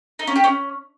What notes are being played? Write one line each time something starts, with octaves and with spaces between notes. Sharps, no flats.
D#4
C#4
G4
C#4